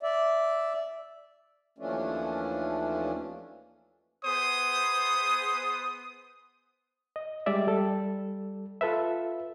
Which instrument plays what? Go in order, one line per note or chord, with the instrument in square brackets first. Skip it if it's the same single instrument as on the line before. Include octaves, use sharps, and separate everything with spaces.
[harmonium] D5 E5
D#2 E3 F3 A3 C#4 D4
[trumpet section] B3 G#4 C5 D#6
[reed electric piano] D#5
G3 G#3 D5 E5
G3 A4
F4 A4 B4 E5